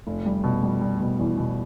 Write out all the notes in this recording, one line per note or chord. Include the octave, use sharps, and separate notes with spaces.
F1
G3
B2
G3
G3
B2
E2
B2